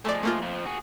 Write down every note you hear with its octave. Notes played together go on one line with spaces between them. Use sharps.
F3 G#3 A3 D5
A3 A#3 F4
F2 F3
F#4 G#4